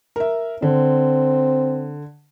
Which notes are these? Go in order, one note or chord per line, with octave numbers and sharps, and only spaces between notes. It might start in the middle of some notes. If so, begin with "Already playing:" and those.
A#4 E5
D3 C4